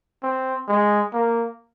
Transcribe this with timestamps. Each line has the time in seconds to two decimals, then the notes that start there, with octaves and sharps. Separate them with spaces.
0.23 C4
0.68 G#3
1.13 A#3